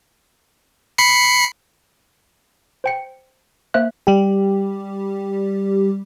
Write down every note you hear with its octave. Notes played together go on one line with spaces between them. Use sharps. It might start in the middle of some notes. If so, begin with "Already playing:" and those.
B5 C7 C#7
C5 G5 C#7
A#3 C5 E5 F#6
G3 G4